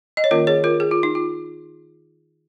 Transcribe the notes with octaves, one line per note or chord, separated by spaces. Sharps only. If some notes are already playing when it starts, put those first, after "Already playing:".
D#5
C#5
D#3 A#3 C#4 F4 A#4
G#4 C#5
F4 A#4
G#4
F4
D#4
F4